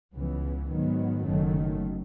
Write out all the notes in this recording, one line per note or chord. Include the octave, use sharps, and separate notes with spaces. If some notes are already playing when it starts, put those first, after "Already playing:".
C#2 C#3 E3 B3
G#2 D#3 F#3 B3
F#1 F#2 D#3 F#3 A3